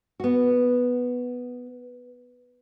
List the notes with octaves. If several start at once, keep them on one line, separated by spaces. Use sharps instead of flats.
B3 F#4